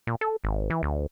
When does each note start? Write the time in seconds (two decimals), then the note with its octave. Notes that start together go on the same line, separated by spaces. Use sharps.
0.07 A#2
0.21 A4
0.44 G#1
0.70 E3
0.83 D2